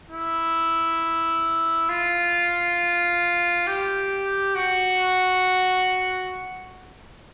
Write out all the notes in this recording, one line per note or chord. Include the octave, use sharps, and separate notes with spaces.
E4
F4
G4
F#4